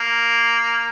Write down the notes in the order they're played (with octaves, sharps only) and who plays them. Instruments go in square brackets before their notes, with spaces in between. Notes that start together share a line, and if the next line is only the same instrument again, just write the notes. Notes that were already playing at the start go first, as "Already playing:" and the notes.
Already playing: [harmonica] A#3